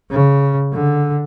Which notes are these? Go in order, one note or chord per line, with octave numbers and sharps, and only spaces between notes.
C#3
D3